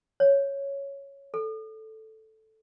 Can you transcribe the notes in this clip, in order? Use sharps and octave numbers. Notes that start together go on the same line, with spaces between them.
C#5
A4